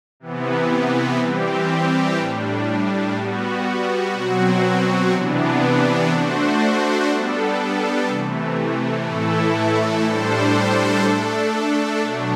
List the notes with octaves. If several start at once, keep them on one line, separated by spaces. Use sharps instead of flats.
C3 E3 B3
E3 G3 C4 G4
A2 G3 D4
G3 B3 F#4
B2 F#3 C4 F#4
C3 E3 B3 D4
A3 D4 F#4 C5
G3 B3 D4 A4
C3 E3 A3
A2 E3 A3 E4 A4
A2 G3 D4 A4 C5
A3 D4 A4
B2 F#3 A3 D4